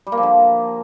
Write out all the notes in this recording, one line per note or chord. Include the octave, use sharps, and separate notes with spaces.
G3
A#3
F3
D3